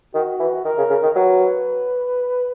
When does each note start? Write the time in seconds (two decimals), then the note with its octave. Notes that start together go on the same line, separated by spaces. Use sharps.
0.14 D#3 F#4
0.39 E3
0.65 D#3 A#4
0.77 C#3
0.90 C#3
1.03 D#3
1.15 F#3 B4